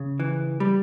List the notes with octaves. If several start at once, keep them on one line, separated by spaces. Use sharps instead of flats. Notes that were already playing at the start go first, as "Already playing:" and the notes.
Already playing: C#3
E3
G3